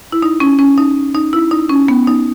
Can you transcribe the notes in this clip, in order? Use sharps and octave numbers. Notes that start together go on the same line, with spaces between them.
E4
D#4
C#4
C#4
D#4
D#4
E4
D#4
C#4
B3
D#4